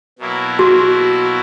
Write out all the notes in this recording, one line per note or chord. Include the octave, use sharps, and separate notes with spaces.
B2 F#3 A#3 E4
F#4